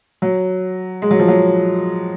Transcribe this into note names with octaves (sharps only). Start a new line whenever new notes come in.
F#3
G#3
F#3
F3
F#3